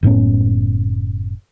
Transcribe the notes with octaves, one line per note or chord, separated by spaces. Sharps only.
F#1 A2 B3 C#4